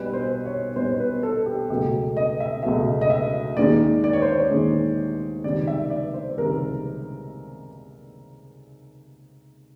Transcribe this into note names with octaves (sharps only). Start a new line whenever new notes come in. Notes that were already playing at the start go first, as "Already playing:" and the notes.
Already playing: B1 B2 G3 B4
C5
C#5
B1 B2 G3 C5
B4
A4
G4
C#2 B2 F#3 A3 G4
D#5
E5
C#2 B2 F#3 A3 E5
D#5
E5
D#2 D#3 G#3 D5
D5
C#5
C5
C#5
D#2 D#3 G#3
C#2 C3 D#3 G3 D5
E5
D5
C5
C#2 C3 D#3 G3 A#4